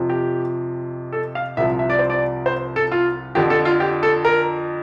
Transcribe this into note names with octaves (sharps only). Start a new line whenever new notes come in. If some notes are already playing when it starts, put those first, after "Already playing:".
Already playing: F2 C3 F3
G4
A4
F5
C2 C3 F3 E5
E5
D5
C5
D5
C5
A4
F4
F2 D3 F3 G4
A4
F4
G4
A4
A#4